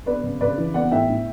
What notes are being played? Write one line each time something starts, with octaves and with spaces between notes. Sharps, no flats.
B3 B4 D5
C#3
C#3 B4 D5
E3
B3 D5 F#5
A2 E5 G5
A2